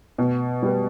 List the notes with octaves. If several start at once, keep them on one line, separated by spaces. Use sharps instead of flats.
B2
G3 B3